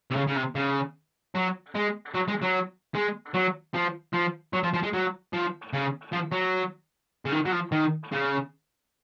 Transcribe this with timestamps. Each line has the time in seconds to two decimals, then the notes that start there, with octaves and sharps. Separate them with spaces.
0.11 C3
0.16 C#3
0.27 C#3
0.36 C3
0.55 C#3
1.35 F#3
1.75 G#3
2.14 F#3
2.28 G#3
2.42 F#3
2.95 G#3
3.34 F#3
3.74 F3
4.14 F3
4.54 F#3
4.63 F3
4.74 F3
4.83 G#3
4.93 F#3
5.33 F3
5.73 C#3
6.13 F3
6.32 F#3
7.25 C#3
7.32 D#3
7.46 F#3
7.52 F3
7.72 D#3
8.12 C#3